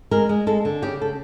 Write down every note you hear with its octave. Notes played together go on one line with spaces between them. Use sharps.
G#3 A#4
G#3
G#3 A4
D3
C#3 G4
A4